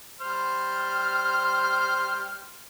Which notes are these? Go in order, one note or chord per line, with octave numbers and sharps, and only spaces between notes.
G3 C5 F6